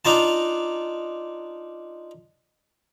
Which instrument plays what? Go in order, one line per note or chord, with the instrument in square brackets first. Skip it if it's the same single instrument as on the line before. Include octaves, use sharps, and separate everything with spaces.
[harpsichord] D4 D#4 F4 A5